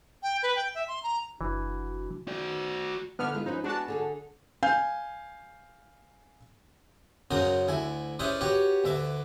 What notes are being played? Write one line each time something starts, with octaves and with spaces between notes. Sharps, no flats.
G5
B4
G5
E5
C6
A#5
F#1 E3 D4 F#4
F#4 D5
D3 B3 D#5 E5 F6
E3 G#3 F4
F3 C#4 D#4 B4
G#3 B3 D4 F#4 G#4 A5
D3 G#4 A4
F5 G#5 G6
F#2 C#3 F#4 A#4 C5 D#6
D2 E4 G#5
C#4 E4 G#4 B4 C5 D5
F#4 G4 B4 C#5
D2 E3 E5 D6